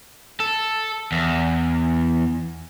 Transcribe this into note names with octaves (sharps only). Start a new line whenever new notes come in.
A4
E2